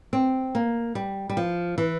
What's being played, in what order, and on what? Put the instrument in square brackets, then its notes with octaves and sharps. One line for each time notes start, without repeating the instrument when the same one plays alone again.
[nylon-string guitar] C4
A#3
G3
G3
F3
E3